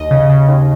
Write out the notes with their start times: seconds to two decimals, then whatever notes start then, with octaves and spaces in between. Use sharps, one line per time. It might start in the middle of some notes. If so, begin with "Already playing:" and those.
Already playing: D#2 D#5
0.11 C#3
0.29 C#3
0.48 D#2